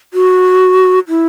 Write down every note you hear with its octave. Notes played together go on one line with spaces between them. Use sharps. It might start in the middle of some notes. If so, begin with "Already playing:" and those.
F#4
E4